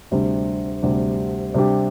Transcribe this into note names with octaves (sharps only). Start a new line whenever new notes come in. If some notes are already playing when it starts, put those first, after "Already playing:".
D2 C3 G3 D4
D2 C3 G3 D4
C3 G3 D4 G4